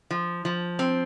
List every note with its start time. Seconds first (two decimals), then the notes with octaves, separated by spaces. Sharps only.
0.11 F3
0.45 F3
0.79 C4